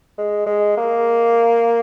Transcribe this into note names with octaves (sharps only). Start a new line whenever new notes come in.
G#3
G#3
A#3